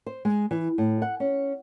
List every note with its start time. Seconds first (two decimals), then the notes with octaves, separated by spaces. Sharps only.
0.06 C5
0.25 G#3
0.51 E3
0.78 A2
1.02 F#5
1.20 C#4